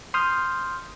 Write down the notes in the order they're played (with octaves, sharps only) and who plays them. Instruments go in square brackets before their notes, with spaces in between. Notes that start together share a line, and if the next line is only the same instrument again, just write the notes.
[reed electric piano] C6 D#6 F6 G6